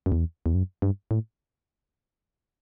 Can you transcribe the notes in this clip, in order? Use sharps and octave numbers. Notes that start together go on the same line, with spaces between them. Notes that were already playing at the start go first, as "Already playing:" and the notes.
F#2
E2
E2
F#2
G2
A2